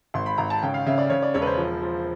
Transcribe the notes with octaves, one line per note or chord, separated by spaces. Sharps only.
G#1 C6
B5
G#1 A#5
A5
C#3 G5
F5
C#3 E5
D5
C#3 C#5
D5
E1 C#5
B4
C5
F3
F3